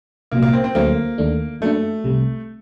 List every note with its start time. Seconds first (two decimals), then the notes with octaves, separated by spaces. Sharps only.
0.32 C2 A#2 F#3 A#3
0.42 A#3
0.53 C4
0.64 C4
0.75 D2 D3 F#3 A3 A#3 C4
1.18 D#2 D#3 A3 D4
1.61 F#2 F#3 A3 A#3 D4
2.04 C2 C3 G3